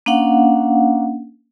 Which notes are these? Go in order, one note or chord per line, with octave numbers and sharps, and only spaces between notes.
A#3 C#4 D4 F5 F#5